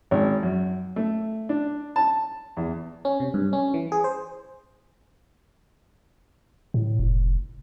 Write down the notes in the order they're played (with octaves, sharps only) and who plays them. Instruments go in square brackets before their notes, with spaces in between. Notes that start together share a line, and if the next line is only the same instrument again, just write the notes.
[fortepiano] G#1
F#2
A3
D4
A5
E2
[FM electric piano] C#4
C3
G2
C#4
E3
G#4
C5
[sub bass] A2
F1